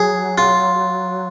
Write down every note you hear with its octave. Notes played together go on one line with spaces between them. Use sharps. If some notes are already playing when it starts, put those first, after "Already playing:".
Already playing: F#3 G#4
F4